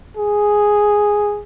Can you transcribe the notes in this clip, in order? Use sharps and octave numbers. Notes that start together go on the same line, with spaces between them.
G#4